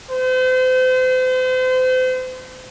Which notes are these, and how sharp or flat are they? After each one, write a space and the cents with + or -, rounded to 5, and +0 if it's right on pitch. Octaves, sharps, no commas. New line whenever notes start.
C5 -35